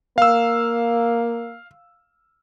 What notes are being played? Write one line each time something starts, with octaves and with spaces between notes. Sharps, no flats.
A#3 F5 E6